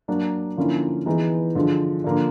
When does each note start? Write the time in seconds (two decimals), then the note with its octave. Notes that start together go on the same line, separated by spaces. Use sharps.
0.08 F#3 A#3 D4
0.57 D3 F3 A#3 C#4 E4
1.06 E3 G#3 B3 D#4
1.55 D3 F3 G#3
2.04 D3 F3 A#3 D4